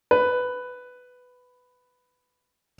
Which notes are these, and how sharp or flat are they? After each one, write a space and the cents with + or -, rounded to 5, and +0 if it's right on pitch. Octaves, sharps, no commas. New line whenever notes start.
B4 +10